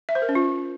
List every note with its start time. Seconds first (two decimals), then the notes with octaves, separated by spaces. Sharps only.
0.09 E5
0.15 C5
0.22 A#4
0.29 C#4
0.35 F4